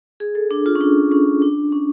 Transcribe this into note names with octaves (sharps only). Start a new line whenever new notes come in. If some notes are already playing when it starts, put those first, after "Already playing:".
G#4
A4
D4
F4
C#4
D4
C#4
D4
C#4